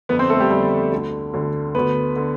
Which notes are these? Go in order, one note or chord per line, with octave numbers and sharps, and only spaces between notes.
F2 D3 B3 B4
C4 C5
A3 A4
G3 G4
F2 D3 G3 G4
D2 D3
D2 D3
D2 D3 B3 B4
D3